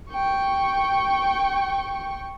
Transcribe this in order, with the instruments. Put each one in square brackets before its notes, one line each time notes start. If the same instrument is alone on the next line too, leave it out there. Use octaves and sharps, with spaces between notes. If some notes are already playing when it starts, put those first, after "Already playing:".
[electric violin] G5 C#6